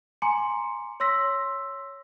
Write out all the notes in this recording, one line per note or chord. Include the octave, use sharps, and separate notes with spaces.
G#5 A#5 C6 D6 C#7
C#5 C6 E6 A#6 B6